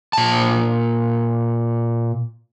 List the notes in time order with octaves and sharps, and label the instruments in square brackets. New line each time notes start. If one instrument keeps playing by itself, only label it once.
[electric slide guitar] A#2 A5